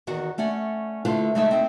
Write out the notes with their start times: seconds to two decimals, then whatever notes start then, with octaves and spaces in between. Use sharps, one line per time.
0.07 E2 D#3 F#4 F#5
0.38 A3 C#4 D5 F#5
1.05 D3 A3 E4 F4 B4 C5
1.35 C#3 G#3 A3 D#4 D5 E5
1.51 C4 D#4